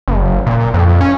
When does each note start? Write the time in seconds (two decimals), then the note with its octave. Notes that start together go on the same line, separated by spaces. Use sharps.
0.08 F#1
0.47 A#2
0.74 F2
1.01 C#4